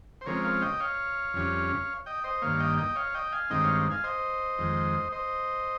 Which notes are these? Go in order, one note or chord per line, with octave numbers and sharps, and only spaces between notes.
C5
C#3 F3 G#3 C4 A#4 C#5
C#5 F5
D#5 G5
C#5 F5
F2 C#3 G3 C#4
D#5 G5
C5 D#5
G2 D#3 A#3 C#5 F5
D#5 G5
D#5 G5
C#5 F5
D#5 G5
F5 G#5
G2 D#3 G#3 C4 D#4 D#5 G5
C#5 F5
F5 G#5
C5 D#5
F2 D#3 G#3
C5 D#5